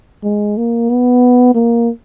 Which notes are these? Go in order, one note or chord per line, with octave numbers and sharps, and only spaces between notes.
G#3
A#3
B3
A#3